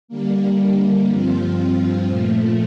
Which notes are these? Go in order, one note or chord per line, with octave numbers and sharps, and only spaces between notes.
D3 G3 A#3
G2 F3 C4 F4
A#2 F3 A3